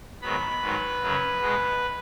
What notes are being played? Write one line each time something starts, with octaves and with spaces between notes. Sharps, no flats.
G#2 D#3 F#3 B3 B5
G#2 D#3 F#3 B4
F#2 C#3 F#3
B2 G#3 B3